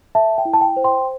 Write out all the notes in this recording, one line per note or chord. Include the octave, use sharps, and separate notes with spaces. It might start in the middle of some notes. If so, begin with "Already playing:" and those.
A4 E5 A5
G5
E4
A5
G5
C5
G5 C6